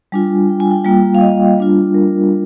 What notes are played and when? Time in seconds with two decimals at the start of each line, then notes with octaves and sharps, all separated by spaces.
0.12 G3 D4 F4 G#5
0.49 G5
0.60 G#5
0.71 G5
0.85 G3 A#3 F4 G5
1.15 F5
1.21 D#5
1.58 G3 D4 F4
1.94 A#4